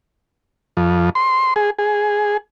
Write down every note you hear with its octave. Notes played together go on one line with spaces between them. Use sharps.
F2
C6
G#4
G#4